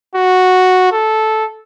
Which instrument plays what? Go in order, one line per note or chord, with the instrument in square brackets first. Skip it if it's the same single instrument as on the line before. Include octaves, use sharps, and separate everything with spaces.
[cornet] F#4
A4